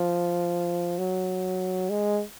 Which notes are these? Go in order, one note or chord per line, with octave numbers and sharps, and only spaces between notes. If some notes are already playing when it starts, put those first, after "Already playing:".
Already playing: F3
F#3
G#3